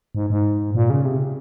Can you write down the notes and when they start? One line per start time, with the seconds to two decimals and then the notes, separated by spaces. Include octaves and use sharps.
0.15 G#2
0.30 G#2
0.75 A#2
0.90 C#3
1.05 C3